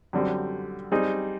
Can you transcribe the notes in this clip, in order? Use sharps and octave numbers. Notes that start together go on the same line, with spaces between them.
F#2 D3 G3 C4
G3 C4 D#4 G#4